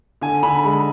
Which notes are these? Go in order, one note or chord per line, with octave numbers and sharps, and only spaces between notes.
D3 G#5
D3 B5
G#3 B5